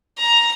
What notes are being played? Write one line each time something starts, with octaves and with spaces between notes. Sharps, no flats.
A#5